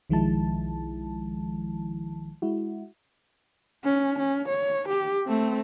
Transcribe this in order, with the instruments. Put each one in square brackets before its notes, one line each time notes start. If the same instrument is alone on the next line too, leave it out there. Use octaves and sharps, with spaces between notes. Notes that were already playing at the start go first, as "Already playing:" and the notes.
[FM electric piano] B1 D#3 F3 G#3 E4 A5
G#3 E4 F#4
[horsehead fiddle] C#4
C#4
C#5
G4
A3 C4